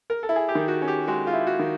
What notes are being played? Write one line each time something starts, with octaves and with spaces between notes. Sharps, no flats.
A#4
A4
E4
G#4
G4
D#3
F#4
C#4
G4
G#3 F#4
F4
E4
F#4
D#3